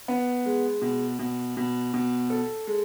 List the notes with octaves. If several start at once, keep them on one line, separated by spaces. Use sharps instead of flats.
B3
G#3
B2
B2
B2
B2
A4
G#3